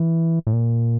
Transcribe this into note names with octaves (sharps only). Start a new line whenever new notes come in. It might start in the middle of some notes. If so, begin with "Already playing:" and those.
Already playing: E3
A2
A#2